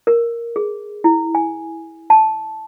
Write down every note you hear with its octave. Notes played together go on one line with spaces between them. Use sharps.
A#4
G#4
E4
G#5
A5